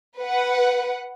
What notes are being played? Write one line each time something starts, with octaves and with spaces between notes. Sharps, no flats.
B4 F#5